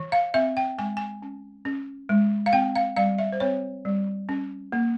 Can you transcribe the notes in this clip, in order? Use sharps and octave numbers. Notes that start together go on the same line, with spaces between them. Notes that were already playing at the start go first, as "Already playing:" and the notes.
Already playing: E3
F5
C4 E5
G5
G#3 G#5
G#5
C#4
C#4
G#3
F5
C4 G5
F5
G3 F5
E5
C5
C4 C#5
G3
C#4
A#3